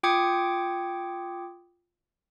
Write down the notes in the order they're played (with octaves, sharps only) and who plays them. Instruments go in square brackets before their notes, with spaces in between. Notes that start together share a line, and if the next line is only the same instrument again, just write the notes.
[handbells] F4 G5 D6 D#6 G#6 C#7